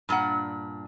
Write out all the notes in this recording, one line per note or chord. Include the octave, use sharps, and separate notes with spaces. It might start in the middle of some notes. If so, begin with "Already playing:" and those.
G2 A#2 D4 F#5